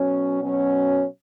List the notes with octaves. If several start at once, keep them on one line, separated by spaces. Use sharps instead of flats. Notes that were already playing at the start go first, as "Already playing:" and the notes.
Already playing: B2 F#3 C#4
B2 F#3 C#4